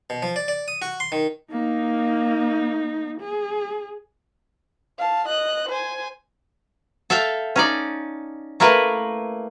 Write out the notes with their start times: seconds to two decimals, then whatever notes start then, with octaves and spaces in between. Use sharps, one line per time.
0.10 B2
0.22 F3
0.36 D5
0.48 D5
0.68 D#6
0.82 F#4
1.00 C6
1.12 D#3
1.51 A#3 D#4
3.21 G#4
4.99 F5 A5
5.28 D#5 F#6
5.69 C5 G#5
7.10 A4 E5 F5 G5 A5
7.56 C#4 D#4 D5
8.60 A3 A#3 E4 A#4 B4